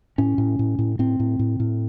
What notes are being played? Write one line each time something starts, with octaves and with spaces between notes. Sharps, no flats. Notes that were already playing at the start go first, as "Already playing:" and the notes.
A2 C#4
A2
A2
A2
A2 C4
A2
A2
A2